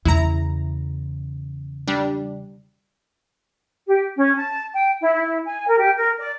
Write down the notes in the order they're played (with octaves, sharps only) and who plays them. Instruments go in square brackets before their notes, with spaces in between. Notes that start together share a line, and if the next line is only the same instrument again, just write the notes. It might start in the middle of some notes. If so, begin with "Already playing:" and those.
[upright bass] E2 C#3 [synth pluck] E4 A#5
[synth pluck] G3 D4
[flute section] G4
C#4
A5
G5
E4
E4
G#5
A#4
G4
A#4
D5